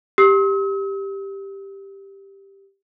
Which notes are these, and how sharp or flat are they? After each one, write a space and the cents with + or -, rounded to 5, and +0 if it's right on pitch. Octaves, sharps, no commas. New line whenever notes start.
G4 +0 E6 -45